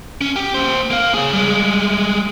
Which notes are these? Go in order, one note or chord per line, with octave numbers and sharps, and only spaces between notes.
C#4
G4
A#3 C5
A#3 F5
G#4 C#5
G3 G#3